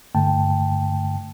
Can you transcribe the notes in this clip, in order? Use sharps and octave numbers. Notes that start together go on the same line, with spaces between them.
G2 D3 A3 G5 A5